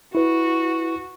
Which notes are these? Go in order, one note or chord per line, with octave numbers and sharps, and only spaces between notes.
E4 F#4 B4